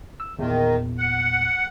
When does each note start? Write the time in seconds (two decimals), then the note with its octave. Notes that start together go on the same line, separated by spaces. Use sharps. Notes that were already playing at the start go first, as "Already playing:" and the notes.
0.20 E6
0.39 E2 A#2 D#3
0.98 F#5